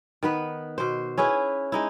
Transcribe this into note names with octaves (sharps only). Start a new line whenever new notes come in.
D#3 B3 B4
B2 C5
C#4 E4 G#4 B4
G#3 D#4 E4